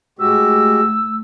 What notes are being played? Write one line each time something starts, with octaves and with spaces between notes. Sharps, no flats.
A2 G#3 A3 F#4 G4 E6